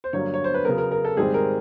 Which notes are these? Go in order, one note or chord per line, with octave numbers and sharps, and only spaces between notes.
C5
G2 D3 F#3 A#3 C#5
C#5
C5
B4
C#3 F#3 B3 A#4
A#4
A#4
A4
G#2 D#3 G3 C4 G#4
A#4